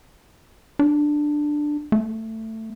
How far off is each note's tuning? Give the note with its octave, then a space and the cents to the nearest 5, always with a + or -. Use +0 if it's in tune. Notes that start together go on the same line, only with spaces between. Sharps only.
D4 +10
A3 +15